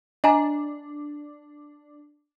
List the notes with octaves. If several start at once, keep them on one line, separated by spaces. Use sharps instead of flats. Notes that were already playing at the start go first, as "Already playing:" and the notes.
D4 D#5 G#5 A#5